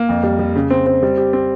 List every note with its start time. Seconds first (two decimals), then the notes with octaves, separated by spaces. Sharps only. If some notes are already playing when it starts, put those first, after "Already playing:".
Already playing: A#3
0.09 F2
0.23 G3
0.39 G3
0.56 C#3
0.71 C4
0.87 C4
1.03 G3
1.18 G4
1.33 C4